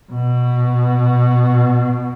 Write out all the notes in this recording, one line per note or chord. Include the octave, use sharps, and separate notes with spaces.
B2